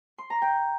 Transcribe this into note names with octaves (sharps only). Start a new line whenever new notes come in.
C6
A#5
G5